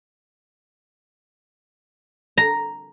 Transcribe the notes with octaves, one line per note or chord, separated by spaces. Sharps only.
A#5